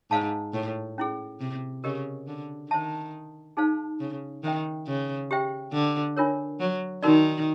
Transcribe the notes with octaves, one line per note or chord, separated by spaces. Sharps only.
G#2 C5 F5 A5
A2
C#4 E4 G#4
C3
C#3 G4 A#4 D#5
D3
D#3 C5 E5 A5
D#4 G#4 C5 F5 A5
C#3
D#3 C5 E5 G5
C#3
G4 C5 E5 G5
D3
D4 F4 A#4 C#5
F#3
D#3 D#4 F#4 A#4 D5